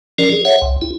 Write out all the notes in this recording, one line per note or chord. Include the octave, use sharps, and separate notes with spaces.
F3 C#4 A#4 D5
G#4
C#5 E5 F#5
C2
E4